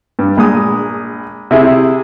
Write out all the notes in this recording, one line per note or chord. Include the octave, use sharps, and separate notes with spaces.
G2
A#1 G#3 D#6
C3 E4 G#4